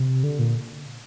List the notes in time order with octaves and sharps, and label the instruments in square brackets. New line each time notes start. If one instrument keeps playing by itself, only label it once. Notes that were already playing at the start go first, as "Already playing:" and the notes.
Already playing: [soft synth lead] C3
D3
A#2